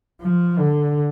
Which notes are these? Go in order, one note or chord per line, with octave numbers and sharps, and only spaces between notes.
F3
D3